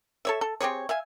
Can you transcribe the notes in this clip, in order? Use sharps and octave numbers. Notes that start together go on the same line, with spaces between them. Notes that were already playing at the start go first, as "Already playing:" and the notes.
A4 C#5 E5
A4
C4 G4 G#4 C#5
E5 F5 G#5